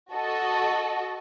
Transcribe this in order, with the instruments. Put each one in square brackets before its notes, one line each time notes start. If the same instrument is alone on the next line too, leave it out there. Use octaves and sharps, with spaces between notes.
[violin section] F#4 A4 D#5